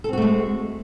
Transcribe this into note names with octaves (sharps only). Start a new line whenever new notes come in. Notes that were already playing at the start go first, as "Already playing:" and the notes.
G#3 A3 C4 F#4 A4